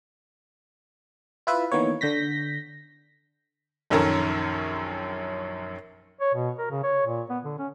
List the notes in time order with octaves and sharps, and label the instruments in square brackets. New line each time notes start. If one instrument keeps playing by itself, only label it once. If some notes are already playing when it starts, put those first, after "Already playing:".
[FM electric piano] E4 F4 B4 E5
D#3 E3 A#3 B3 C#5
D3 G6 A#6 B6
[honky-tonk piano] A#1 F#2 D#3 C#4 A4 A#4
[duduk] C#5
B2
A#4
C#3
C#5
A#2
B3
D3
C#4